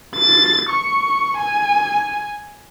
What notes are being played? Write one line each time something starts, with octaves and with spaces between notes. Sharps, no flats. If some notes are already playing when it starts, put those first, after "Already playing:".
A6
C#6
G#5